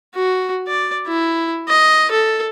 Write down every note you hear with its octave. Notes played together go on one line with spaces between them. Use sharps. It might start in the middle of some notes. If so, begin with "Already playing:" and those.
F#4
D5
E4
D#5
A4